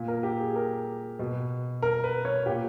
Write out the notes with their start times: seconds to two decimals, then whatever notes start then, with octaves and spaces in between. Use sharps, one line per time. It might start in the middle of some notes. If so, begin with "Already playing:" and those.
Already playing: A#2
0.08 A#4
0.23 G4
0.40 G#4
0.56 A#4
1.19 B2
1.82 A#4
2.04 B4
2.25 C#5
2.46 A#2 G4